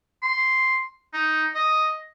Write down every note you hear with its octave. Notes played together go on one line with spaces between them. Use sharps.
C6
D#4
D#5